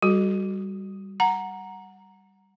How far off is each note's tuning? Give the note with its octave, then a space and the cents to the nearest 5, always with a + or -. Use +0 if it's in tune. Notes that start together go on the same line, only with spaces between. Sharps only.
G3 +0 F#4 +0 A4 -35
F#5 +0 A#5 +0